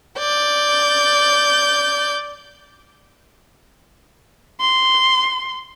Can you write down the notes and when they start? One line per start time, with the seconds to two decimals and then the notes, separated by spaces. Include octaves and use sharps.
0.18 D5 G6
4.60 C6